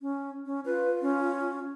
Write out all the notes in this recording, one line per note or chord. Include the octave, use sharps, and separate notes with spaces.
C#4
C#4
F4 B4
C#4